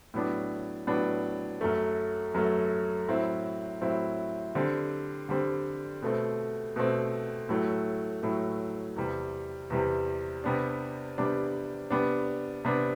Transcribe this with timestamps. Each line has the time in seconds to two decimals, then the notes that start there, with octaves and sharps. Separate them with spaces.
0.14 A2 F#3 B3 D4
0.87 A2 F#3 B3 D4
1.61 F#2 F#3 A3
2.34 F#2 F#3 A3
3.08 A2 F#3 C4 E4
3.81 A2 F#3 C4 E4
4.55 D3 G3 C4
5.29 D3 G3 C4
6.02 B2 A3 C4
6.76 B2 A3 C4
7.49 A2 F#3 A3
8.22 A2 F#3 A3
8.96 E2 C3 G3
9.70 E2 C3 G3
10.44 C3 G3 B3 D4
11.18 C3 G3 B3 D4
11.90 C3 G3 B3 D4
12.65 C3 G3 B3 D4